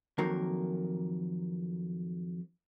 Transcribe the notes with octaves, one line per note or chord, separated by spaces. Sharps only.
F2 D#3 F#3 A#3 A#4